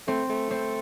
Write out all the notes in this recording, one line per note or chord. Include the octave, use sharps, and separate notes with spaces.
A3 C4
A3
C4